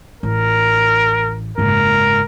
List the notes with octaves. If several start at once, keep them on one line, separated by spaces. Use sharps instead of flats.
A1 A#4
F#1 G#2 A#4